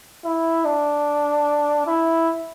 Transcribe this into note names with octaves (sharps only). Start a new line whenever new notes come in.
E4
D4
E4